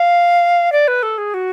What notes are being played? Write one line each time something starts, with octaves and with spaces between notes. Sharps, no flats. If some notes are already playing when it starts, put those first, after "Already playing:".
Already playing: F5
D5
B4
A4
G#4
F#4